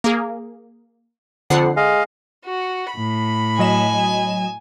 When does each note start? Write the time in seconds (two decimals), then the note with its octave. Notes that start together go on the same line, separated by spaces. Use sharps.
0.04 A#3 G#4
1.50 F2 D3 F#5 C7
1.77 G#3 D#5 F5
2.46 F#4
2.92 A2 B5
3.59 F#3 D#5 G#5 E7